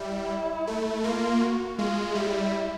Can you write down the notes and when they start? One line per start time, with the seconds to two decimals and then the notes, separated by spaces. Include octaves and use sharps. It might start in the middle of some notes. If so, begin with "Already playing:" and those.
Already playing: G3 E4
0.67 A3
1.04 A#3 F4
1.41 F#4
1.78 G#3 F4
2.14 G3 E4